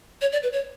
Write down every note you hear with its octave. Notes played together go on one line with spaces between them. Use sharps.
C#5
D5
B4
C#5